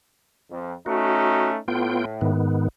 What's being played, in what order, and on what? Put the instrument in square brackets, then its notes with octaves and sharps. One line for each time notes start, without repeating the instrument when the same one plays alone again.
[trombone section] F2
[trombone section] A3 C#4 D#4 [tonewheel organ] F#4
[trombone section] A2 [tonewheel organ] B3 F4 G5
[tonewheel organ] G#2 D#3 B3